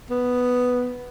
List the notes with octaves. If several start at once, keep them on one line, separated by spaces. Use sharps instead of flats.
B3